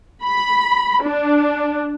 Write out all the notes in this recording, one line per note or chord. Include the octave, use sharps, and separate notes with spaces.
B5
D4